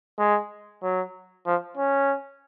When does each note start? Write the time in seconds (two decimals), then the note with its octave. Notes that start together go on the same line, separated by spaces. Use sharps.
0.19 G#3
0.83 F#3
1.46 F3
1.77 C#4